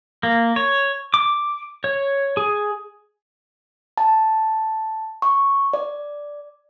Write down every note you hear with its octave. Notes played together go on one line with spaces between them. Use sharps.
A#3
C#5
D6
C#5
G#4
A5
C#6
D5